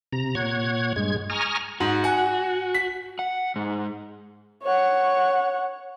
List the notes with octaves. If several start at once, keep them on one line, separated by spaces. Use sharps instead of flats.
C3 A#5
A#2 C#5 F#5 G#6
G2 G#3 G#6
G#5 A#5 C#6 D#6 F6
G#2 F#4
F#5 G#5
B6
F#5
G#2
C#5 F#5